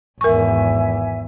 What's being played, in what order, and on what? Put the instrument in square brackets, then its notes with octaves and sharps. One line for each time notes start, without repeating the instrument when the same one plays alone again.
[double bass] G#1 E2 [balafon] A#4 C#6 [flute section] E5 G#5